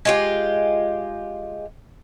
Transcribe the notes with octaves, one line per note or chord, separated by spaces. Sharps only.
G#3 F4 G4